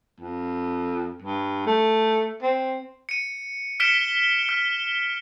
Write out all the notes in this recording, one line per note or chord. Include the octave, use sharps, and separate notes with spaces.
F2
G2
A3
C4
C#7 D#7
F6 B6 C#7 D7 E7 G7
F6